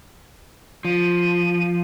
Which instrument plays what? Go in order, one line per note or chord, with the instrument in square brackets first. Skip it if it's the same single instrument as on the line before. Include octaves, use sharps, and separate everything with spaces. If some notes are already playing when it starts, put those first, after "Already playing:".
[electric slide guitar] F3 [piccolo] D#7